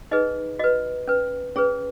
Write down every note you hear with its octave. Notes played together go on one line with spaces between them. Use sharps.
D#4 G#4 B4 D#5
F#4 B4 D#5
C#4 B4
C#4 G#4 B4 C#5